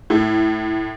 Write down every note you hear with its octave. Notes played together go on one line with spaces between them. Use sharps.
A2